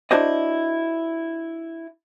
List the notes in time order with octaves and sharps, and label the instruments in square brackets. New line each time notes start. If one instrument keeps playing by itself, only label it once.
[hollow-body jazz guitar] D4 E4 F#4 C5 D5 D#5